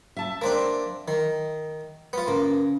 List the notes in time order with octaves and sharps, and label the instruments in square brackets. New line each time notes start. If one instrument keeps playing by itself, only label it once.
[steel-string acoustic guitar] E5 A5
[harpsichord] A#3 C4 D4
D#3
B3 F4
[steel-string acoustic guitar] C#3 [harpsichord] A#3